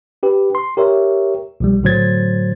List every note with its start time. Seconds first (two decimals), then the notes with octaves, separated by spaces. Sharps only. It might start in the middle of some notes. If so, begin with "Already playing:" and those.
0.23 D4 G4 B4
0.55 C6
0.77 G4 A#4 C#5 E5
1.60 B1 F3 G3
1.83 A2 D3 F#3 C5 G#6 A6